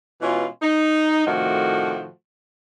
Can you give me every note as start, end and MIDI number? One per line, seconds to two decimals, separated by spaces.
0.22 0.47 47
0.22 0.47 52
0.22 0.47 56
0.22 0.47 61
0.22 0.47 65
0.62 1.26 63
1.27 2.09 45
1.27 2.09 48
1.27 2.09 51
1.27 2.09 53
1.27 2.09 57
1.27 2.09 66